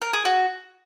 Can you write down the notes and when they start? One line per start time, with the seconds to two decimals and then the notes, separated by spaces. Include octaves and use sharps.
0.02 A#4
0.13 G#4
0.25 F#4